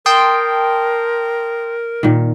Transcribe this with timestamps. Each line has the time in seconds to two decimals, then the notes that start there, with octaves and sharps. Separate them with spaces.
0.06 A#4 G5 A5 C6 D#6
2.03 A#2 D#3